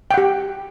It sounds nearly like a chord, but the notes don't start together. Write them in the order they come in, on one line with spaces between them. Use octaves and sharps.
G5 F#5 G4